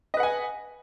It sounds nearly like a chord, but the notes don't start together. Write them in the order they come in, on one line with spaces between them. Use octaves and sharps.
D#5 B4 F#5 G#5